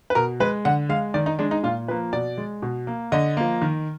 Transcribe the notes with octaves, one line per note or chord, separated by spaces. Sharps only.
B4
B2 A#4
G#3 B4
D3 F#5
G#3 F5
D#3 D5
D#4
G#3 D4
D#4
A#2 F4
F3 A#3 B4
B2 D5
G#3
B2
A#3
D3 D#5
F3 A#3
D#3